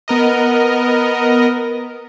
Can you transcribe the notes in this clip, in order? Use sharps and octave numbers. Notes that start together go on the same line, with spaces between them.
B3 A#4 D#5